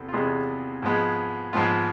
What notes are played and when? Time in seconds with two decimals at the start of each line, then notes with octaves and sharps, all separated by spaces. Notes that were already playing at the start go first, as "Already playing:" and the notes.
Already playing: E2 C3 B3 A4
0.09 F4
0.13 E2 C3 G#3 B3 G#4
0.82 G#2 F3 G#3 B3
1.53 G#2 F3 G#3 B3 F4